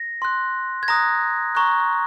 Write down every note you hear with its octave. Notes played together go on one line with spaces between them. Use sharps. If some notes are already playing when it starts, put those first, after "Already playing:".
Already playing: A#6
C6 F#6
G#6
A#5 D#6 F#6 A#6
A#5 C#6 F#6